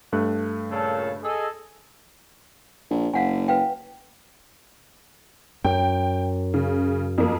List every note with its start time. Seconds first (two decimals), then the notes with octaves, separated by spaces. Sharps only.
0.12 G2 A3 F#6
0.71 A#2 C#3 A4
1.22 G#4 A4 D#5
2.90 A#1
3.14 F#1 F5 F#5 G#5
3.48 B4 F5 G5
5.64 F#2 G5
6.54 C#3
7.18 F2 A#3